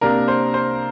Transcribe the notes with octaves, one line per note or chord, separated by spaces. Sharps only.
C3 A#3 D4 A#4
C5
C5